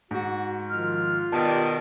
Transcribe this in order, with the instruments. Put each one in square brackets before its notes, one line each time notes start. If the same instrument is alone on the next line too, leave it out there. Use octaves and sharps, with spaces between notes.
[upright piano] G#2 [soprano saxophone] F#4
[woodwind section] D#3 F3 F6 [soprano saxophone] F4
[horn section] B2 D#3 [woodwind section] G4 D5 [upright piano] A5